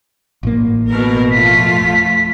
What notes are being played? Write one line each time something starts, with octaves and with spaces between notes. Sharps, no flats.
A1 A2 A#3
B2 A#4
F2 A3 F4 B6